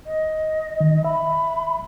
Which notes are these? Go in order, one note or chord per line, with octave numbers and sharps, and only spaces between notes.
D#5
D#3
E5 B5